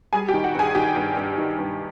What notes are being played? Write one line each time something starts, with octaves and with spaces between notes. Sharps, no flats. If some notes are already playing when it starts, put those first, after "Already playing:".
G3 G#4 G#5
G4 G5
D#3
F#4 F#5
G2 G#4 G#5
D#3 G4 G5
G2
G2
D#3
G2